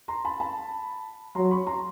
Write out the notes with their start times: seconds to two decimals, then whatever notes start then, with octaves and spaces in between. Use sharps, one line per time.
0.08 A#5 C6
0.25 A5 B5
0.40 A5 B5
1.35 F#3 A#5 C6
1.51 B5 C#6
1.67 A#5 C6